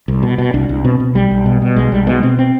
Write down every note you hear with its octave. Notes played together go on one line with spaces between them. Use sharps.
C2
B2
B2
C2 D4
C2
B2 C4
B2
B1 G3
B1
B2
B2
B1 G#3
B1 G3
B2 G#3
B2 C4
C4